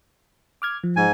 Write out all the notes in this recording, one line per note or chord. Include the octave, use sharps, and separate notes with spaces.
D6 F6 G#6
F3
G#2 G#5